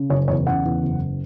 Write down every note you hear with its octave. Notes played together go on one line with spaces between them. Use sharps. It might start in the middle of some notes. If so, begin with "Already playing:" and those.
Already playing: C#3
F#1 C#5
E2 C#5
C#3 F#5
E2
F#1